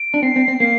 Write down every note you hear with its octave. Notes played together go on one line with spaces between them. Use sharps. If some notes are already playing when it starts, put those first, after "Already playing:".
Already playing: D7
D4
C4 C7
C4
C4
A#3